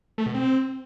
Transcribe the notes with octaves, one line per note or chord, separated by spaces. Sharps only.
A3
B2
C4